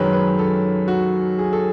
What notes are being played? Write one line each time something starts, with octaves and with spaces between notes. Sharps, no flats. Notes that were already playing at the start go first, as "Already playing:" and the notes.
Already playing: F#2 D#3 G#3 C#4 B4
B4
A4
F#4
G#4
A4